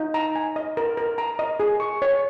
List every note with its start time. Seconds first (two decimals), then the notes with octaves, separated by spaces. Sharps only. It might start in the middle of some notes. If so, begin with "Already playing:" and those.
Already playing: D#4
0.14 A#5
0.36 G#5
0.56 D#5
0.77 A#4
0.97 A#4
1.18 A#5
1.39 D#5
1.60 G#4
1.80 C#6
2.02 C#5